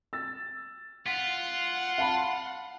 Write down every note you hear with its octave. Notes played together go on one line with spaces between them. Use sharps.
E6 A6
F4 F#5 B6
F5 A5 B5